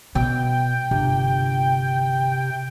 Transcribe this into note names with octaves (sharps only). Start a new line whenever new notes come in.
B2 G5
G1 C3